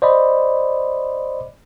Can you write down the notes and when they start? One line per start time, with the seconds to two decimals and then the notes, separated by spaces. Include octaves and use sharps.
0.02 C5 D5 D#5 B5